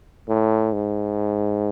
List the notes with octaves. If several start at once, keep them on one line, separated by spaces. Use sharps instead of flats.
A2
G#2